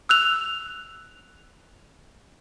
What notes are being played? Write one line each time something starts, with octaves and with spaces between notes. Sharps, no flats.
E6 F#6 F7